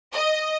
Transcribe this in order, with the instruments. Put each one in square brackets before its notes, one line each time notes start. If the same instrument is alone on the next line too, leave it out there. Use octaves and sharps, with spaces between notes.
[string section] D#5